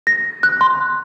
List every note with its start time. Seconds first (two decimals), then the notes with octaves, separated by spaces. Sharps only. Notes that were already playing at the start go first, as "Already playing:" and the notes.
0.07 A#6
0.43 F#6
0.61 C6